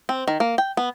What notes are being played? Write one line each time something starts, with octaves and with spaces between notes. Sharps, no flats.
C4
D#3
A#3
G5
B3